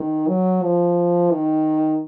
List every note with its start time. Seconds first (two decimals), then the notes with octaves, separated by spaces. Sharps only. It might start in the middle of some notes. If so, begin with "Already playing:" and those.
Already playing: D#3
0.28 F#3
0.63 F3
1.32 D#3